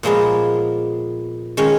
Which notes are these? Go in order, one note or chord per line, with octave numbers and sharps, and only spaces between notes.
A#2 F3 G#3 B3
D#3 G#3 C#4